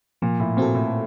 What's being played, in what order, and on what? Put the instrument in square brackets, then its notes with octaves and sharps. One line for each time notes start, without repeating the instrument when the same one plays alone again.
[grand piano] A#2 [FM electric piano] F3
[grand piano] A2
[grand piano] A#2 [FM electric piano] C4 F#4 A4
[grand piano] A2